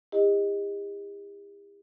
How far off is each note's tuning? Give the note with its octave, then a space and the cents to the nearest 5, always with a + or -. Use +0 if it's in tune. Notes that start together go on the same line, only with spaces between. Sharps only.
E4 -5 G4 +45 D#5 +0